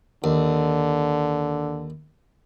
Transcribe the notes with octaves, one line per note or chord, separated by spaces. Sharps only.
D#2 D3